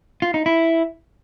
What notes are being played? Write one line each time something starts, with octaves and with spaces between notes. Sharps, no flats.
F4
D#4
E4